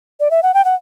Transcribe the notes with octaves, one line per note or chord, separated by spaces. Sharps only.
D5
E5
F#5
G5
F#5